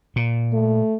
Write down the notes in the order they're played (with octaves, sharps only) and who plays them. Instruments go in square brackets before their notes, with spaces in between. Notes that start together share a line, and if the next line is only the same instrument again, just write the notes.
[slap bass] A#2
[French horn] A3